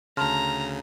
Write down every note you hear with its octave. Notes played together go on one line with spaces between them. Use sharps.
D2 C#3 A5 A#5 C6 F6